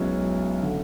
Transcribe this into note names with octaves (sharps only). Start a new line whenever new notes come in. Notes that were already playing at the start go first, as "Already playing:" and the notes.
Already playing: B1 B2 G#3 C#4 E4
D3